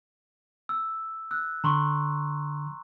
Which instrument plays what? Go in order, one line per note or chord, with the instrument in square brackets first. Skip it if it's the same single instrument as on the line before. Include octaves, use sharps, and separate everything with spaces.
[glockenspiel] E6
E6 F#6
[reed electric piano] D3 [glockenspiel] A#5 C6 C#6